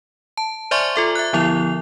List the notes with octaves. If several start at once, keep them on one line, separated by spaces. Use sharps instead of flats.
A5
C5 D5 E5 G#5 C6 C#6
F4 A4 E5
E5 F#6
D3 F3 B3 E4 F7